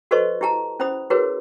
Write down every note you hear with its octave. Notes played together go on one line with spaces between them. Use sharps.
F#4 A4 B4 C5 D#5 C#6
E4 G4 A5 A#5
C#4 E4 C5 B5 D#6
E4 F#4 G#4 A#4 B4 C#5